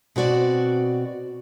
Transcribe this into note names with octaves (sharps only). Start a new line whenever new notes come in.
B2 C4 F#4 D5